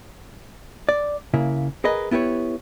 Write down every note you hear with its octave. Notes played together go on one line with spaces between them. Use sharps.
D5
C#3 A#3 E4
G#4 A#4 B4 D#5
B3 E4 G4 B4 C#5